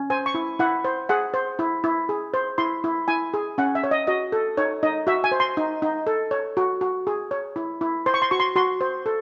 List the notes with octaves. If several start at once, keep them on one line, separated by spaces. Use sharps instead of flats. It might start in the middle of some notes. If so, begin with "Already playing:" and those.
Already playing: C#4
C5 G#5
C#6
E4
E4 F#5
C5
G#4 F#5
C5
E4
E4
G#4
C5
E4 C6
E4
E4 G#5
G#4
C#4 F#5
E5
C#5
D#5
F#4 D#5
A4
D#4 C#5
D#4 D#5
F#4 E5
G#5
C5
C6
D#4
D#4
A4
C#5
F#4
F#4
G#4
C#5
E4
E4
C5 C6
C#6
C6
F#4 C#6
C6
F#4 C6
C5
A4